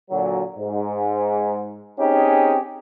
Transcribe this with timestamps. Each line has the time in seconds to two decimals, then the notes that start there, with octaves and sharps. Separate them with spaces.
0.10 A#2 D3 F#3
0.58 G#2
1.99 C4 C#4 D#4 G4 G#4